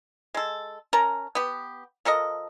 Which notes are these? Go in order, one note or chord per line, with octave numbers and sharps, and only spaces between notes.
G#3 A4
C#4 A#4 A5 A#5
B3 G4
F3 A4 A#4 D#5